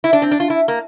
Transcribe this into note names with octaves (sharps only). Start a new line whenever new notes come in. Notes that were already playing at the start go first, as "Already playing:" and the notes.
E4
D4
C4
D4
F4
E4
A#3